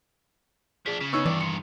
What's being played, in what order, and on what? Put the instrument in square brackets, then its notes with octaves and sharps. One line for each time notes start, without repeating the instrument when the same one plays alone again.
[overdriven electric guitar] F3 D4 [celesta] G#4 B6
[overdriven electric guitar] C#3 [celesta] B6
[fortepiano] B3 C#4 D#4 [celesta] C#6 E6
[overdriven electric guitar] G2 D#3 [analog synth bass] E3 [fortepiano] D5
[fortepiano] C6 [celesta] C#7